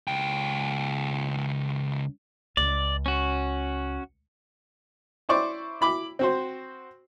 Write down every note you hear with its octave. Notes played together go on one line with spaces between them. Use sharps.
C#2 G5
C#2 D5
C#4 F#4
E4 C5 D5 C#6 D6
E4 B5 D6
C4 F#4 C5